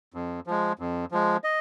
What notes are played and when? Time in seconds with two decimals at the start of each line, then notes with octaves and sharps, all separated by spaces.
0.14 F2
0.47 F3 G#3
0.79 F2
1.11 F3 G#3
1.44 D#5